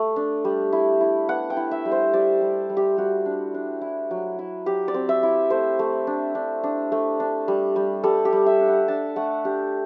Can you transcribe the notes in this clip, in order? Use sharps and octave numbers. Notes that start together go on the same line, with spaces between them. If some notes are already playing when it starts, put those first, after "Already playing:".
Already playing: A3
D4
G3
E4
E4
B3 F#5
G5
E4
E5
G3
C5
G3 D5
G3
G3
G4
G3 F#4
D4
D4
E4
F#3
E4
F#3 G4
D5
C4
E5
E4
A3 C5
A3
D4
D4
D4
A3
D4
G3
G3
G3 A4
G4
G3
E5
D4
F#5
D4 A5
A3 F#5
D4 G4